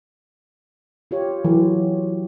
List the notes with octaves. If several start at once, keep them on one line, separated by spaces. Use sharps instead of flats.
F4 G4 C#5
E3 F#3